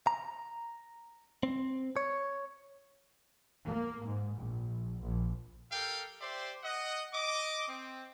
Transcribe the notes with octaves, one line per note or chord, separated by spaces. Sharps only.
A#5
C4
C#5
A#3
G#2
A#1
A#1
G4 A4 A#4 F5 G5
G4 C5 D5 E5 G5 C6
D#5 F#5
D#5 D6
C4